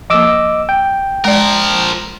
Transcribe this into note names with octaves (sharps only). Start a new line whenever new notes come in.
F3 A#3 D#5 D6 E6
G5
F3 G#3 A#4 D5